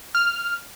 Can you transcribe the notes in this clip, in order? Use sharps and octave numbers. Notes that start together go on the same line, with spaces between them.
F6